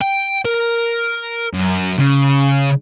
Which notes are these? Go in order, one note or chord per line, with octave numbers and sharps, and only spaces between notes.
G5
A#4
F#2
C#3